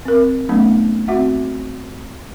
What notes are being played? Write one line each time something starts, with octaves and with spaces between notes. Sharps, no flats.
C4 A#4
F#3 A3 B3 C#4 D#4
C4 F#4 E5 F#5